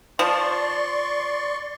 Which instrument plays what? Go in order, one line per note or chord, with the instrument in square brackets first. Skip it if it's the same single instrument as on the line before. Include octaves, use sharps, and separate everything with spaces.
[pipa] F3 [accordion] D5 C6 C#6